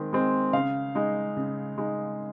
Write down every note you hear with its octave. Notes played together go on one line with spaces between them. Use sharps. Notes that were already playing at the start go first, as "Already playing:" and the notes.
Already playing: D#3 G#3 C4
G#3 C4
C#3 F5
G#3 D#4
C#3
G#3 D#4